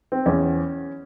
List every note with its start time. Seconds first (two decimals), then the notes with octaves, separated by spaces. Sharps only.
0.12 C4
0.26 E2 C#4